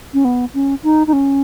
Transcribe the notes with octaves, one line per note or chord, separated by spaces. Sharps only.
C#4
B3
C#4
D#4
D#4
C#4